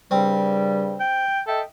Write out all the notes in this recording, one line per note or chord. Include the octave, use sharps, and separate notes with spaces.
G2 C#3 G3 C4
G5
A4 D#5 E5 G5